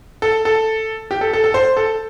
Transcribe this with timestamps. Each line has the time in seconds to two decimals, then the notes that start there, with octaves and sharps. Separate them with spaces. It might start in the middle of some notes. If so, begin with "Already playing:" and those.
0.22 A4
0.45 A4
1.11 G4
1.21 A4
1.33 A4
1.44 A4
1.54 C5
1.77 A4